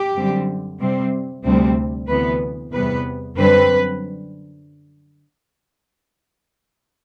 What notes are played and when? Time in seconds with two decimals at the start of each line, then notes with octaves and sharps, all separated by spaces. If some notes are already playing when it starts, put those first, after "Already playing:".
Already playing: G4
0.16 F#2 D3 G3 C4
0.79 C3 G3 C4
1.43 D2 C3 G3 C4
2.08 D2 C3 E3 B3 B4
2.72 E2 C3 G3 B3 B4
3.37 F#2 D3 G3 C4 B4